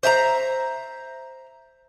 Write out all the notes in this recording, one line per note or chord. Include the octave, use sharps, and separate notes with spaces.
C5 E5 A5 A#5